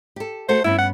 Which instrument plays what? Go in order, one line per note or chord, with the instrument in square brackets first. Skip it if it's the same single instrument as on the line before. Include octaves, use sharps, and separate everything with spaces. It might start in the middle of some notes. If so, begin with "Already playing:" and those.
[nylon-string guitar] G4 A4
[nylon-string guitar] A3 F#4 A4 [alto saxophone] C5
[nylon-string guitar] G2 B3 C#4 [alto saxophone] E4
[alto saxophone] F#5